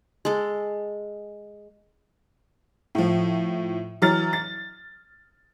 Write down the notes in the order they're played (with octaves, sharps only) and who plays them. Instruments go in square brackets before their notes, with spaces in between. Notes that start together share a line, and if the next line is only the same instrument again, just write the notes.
[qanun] G#3 A4
[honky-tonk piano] A2 F3
E3 F#3 F6 A6
A6